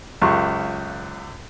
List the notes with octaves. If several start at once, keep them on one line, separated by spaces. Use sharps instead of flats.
C#2 F#2 F4 G4 C#6